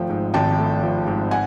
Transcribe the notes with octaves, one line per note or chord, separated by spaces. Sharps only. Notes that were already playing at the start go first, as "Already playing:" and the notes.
Already playing: G#1 F3 A3 G5
G#2
G#1 G5 A5
A3
F3
G#2
F#5 G#5